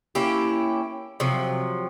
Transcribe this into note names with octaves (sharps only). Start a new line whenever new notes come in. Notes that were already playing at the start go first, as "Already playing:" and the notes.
A#3 C#4 E4 G4
C3 F3 F#3